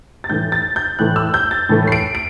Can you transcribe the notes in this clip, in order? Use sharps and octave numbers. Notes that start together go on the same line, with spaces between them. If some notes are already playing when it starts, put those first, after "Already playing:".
A6
A2 E3 A3 G6
A6
G6
A2 E3 A3 F#6
E6
G6
A6
A2 E3 A3
C7
D7
D7